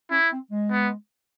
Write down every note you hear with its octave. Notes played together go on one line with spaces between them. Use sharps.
C#4 E4
C4
G#3
B3